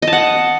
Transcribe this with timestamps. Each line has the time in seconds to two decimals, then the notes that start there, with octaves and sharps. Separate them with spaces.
0.02 D#5
0.07 A5
0.13 F#5